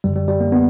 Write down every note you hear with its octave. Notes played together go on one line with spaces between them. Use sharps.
F#2 D3 G3
G3
G3
A#3
B3